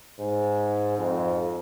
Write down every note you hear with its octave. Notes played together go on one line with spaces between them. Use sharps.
G#2
F2